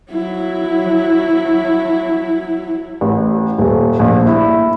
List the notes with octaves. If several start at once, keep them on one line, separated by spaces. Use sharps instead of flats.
F#3 E4
A1
D#1
A#1
E4